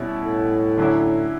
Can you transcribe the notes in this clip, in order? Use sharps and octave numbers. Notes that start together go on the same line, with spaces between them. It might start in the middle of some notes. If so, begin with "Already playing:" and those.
Already playing: B2 G3 C#4 E4
A2
D3 F#3 C#4 E4